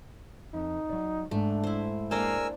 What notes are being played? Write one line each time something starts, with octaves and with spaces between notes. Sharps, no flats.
F2 D#4
F#3 D5
G#2 A3 D4
E4 C5
G#3 A#3 D4 A#4 C5 G#5 E6